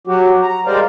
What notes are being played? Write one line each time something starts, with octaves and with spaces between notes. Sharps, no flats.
F#3 F#4 G4
A#5
G3 G#3 A#4 C5 D5 F5